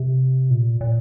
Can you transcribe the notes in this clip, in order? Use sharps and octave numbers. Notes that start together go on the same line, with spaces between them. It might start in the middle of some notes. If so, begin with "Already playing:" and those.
Already playing: C3
A#2
A#2